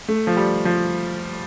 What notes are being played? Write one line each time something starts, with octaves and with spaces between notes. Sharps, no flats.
A3
F3
G3
F3